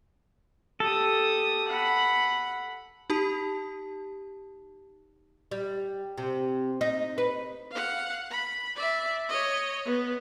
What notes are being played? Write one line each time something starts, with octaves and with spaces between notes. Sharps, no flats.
G4 A4 D#6
F#5 B5
D#4 G4 A5
G3
C3
D#4
B4
F5 F#5
B5
D5 E5
C#5 D#5
B3